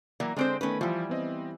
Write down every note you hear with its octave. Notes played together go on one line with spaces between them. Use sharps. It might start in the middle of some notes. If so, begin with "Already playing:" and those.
E3 F#3 A#3 D5 E5 A#5
D3 G#3 C4 C5 D5 D7
D#3 A3 B3 C#4 B4
E3 F3 G3 F4
B3 C4 D#5